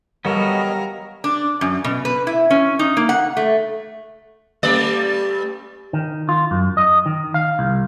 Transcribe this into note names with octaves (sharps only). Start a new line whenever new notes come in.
G3 B3 F#4 A4 A#4 C#5 D#5 F5
D4
F#2
B2
B4
E4
C#4
D#4
A#3
F#5
A3
G3 A3 D5
D#3
F4
F#2
D#5
D#3
F5
C2